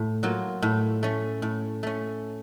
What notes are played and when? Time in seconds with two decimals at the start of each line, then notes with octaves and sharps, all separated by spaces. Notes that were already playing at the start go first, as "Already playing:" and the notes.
Already playing: A2
0.23 F#3 A#3 F4
0.62 A2
1.03 A3 C#4
1.42 A2
1.83 A3 C#4